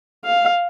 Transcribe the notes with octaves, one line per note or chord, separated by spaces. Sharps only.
F5